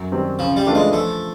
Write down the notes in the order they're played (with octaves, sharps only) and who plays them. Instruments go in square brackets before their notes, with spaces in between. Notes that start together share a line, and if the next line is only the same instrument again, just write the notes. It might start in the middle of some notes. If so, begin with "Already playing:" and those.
Already playing: [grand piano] F#2
D#3 G3 C4
[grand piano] C#3 [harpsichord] F3
[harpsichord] G3
[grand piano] E3 A3 D4 F4
[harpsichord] G#3
[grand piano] F3 [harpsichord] A3